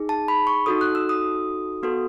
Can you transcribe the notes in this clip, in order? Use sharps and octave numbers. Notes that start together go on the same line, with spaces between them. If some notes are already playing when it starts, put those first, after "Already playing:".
Already playing: D#4 G#4
A5
B5
C#6
D#4 F#4 A4 D#6
F#6
E6
D#6
B3 F#4 A4